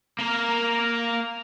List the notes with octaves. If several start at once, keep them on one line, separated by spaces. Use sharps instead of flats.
A#3 A#4